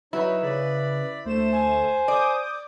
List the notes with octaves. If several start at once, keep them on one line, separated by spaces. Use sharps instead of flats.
F#3 D#4 E4 B4 C#5
C#3 D5 B5
D2 A3 C5 E7
G#5
D5 D6 D#6 G6